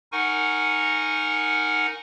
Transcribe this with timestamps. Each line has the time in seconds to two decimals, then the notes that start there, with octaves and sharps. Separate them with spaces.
0.12 D#4 A#4 F#5 G#5 C#6